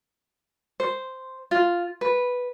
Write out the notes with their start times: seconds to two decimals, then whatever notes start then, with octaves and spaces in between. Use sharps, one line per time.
0.80 C5
1.51 F4
2.01 B4